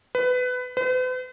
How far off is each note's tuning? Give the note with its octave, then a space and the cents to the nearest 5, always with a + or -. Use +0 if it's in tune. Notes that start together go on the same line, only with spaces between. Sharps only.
B4 +20
B4 +45